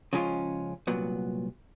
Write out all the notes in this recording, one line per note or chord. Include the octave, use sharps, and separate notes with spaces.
C#3 F3 G#3 C#4 F4
C2 A#2 F#3 B3